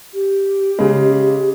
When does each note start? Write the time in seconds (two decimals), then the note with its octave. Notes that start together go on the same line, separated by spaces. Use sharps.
0.14 G4
0.79 C#3 G#3